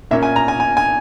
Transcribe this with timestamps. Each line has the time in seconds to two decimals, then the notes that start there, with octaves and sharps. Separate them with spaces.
0.11 A#2 A#3 C#4 E5
0.23 G#5
0.36 A#5
0.48 G#5
0.60 G#5
0.77 G#5